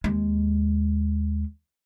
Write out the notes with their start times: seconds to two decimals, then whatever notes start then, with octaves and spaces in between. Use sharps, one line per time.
0.04 D#2 G#3